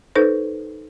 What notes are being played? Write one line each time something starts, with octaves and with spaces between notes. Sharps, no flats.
D#4 A4 B4 C5